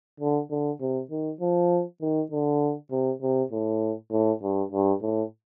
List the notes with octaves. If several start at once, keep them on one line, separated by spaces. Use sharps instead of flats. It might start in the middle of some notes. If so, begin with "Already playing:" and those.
D3
D3
C3
D#3
F3
D#3
D3
C3
C3
A2
A2
G2
G2
A2